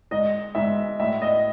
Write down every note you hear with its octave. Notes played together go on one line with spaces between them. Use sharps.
G#2 D#5
G#2 E5
A2 E5
D#5